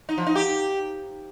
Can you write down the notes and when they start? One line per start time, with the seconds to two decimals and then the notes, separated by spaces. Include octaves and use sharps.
0.09 D#4
0.18 F3
0.27 D#4
0.35 G4